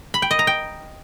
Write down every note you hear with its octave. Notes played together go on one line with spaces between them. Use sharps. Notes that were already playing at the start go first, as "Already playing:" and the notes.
B5
G5
D#5
A#5
G5